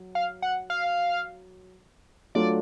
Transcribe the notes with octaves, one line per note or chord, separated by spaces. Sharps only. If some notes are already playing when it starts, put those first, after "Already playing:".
Already playing: F#3
F5
F#5
F5
F#3 A3 D4 F4 D5